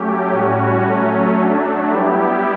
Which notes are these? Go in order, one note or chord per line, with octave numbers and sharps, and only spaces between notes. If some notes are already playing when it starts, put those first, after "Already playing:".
Already playing: F#3 A3 C#4 G4
A2 G3 C#4 F#4
F#3 A3 C#4
F#3 A3 D4
G3 B3 E4 G4